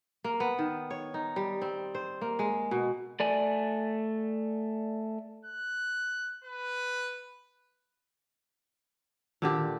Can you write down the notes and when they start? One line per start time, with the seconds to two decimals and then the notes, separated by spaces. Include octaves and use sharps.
0.24 A#3
0.40 B3
0.59 D#3
0.91 C#5
1.14 D#4
1.36 G3
1.62 C4
1.95 C5
2.21 A#3
2.39 G#3
2.71 B2
3.20 A3 D5 G#5
5.45 F#6
6.44 B4
9.42 A#2 D3 D#3 G4